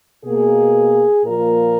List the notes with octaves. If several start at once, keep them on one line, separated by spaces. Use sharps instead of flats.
B2 A#3 G#4
A#2 F3 A#3 A#4